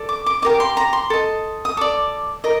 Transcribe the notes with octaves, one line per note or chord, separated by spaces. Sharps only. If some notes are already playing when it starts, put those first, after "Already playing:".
Already playing: A4 D5
D6
D6
G4 A#4 D#5 D6
C6
A#5
C6
A4 D#5
D#6
A4 D5 D6
A#4 D#5